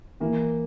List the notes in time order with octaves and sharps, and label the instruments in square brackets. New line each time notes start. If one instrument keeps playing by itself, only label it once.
[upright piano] E3 [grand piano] A#3